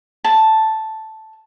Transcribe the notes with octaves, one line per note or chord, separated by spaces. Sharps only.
A5